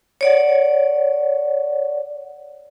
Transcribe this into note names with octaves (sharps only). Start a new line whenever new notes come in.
C#5 D5 F#5